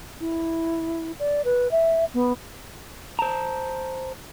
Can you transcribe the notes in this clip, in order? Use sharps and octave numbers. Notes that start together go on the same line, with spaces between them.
E4
D5
B4
E5
B3
C5 A5 A#5